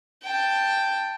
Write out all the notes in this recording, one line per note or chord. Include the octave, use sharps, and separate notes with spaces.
G5 A5